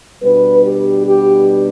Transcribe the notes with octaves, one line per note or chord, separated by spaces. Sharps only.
B2 G3 B3 D4 B4
G4
G4